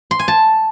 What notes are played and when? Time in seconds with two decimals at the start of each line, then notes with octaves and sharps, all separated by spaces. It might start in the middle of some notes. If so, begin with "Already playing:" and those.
0.11 C6
0.19 G#5
0.28 A5